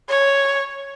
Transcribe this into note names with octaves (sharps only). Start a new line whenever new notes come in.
C#5